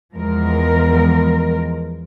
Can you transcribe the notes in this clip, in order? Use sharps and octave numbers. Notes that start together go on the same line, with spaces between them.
E2 F3 G#3 A#4